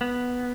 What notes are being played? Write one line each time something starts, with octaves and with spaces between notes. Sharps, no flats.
B3